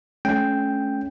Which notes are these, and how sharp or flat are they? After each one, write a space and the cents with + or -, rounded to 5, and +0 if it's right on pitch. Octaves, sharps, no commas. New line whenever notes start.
A3 -30 C#4 +0 G5 +0